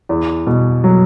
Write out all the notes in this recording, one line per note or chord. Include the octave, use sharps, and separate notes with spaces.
E2
B2
F#3